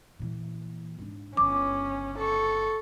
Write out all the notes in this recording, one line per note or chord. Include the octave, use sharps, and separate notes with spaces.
A#2 E3
G#2 D4
G1 C#3 C#4 D6
A4 C#6